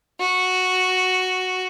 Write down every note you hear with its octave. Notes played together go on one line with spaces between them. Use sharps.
F#4